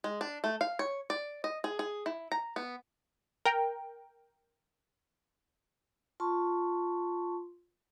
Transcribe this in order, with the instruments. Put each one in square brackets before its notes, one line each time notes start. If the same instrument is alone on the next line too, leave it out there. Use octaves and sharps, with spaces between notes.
[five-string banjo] G#3
D4
A3
F5
C#5
D5
D#5
G#4
G#4
E4
A#5
B3
[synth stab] A#4 G5
[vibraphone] F4 A5 C6 C#6